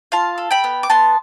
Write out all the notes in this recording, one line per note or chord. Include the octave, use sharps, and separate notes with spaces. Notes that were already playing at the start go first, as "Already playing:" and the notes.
F4 F5 A5
A4
G5 B5
B3
D6
B3 A5 C6